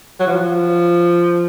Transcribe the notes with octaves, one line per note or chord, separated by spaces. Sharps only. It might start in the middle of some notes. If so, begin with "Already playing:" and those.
F#3
F3